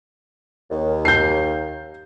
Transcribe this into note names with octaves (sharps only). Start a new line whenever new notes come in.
D#2
G6 C7